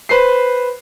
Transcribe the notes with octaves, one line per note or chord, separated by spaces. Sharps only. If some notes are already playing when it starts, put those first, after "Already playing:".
B4 C5 C7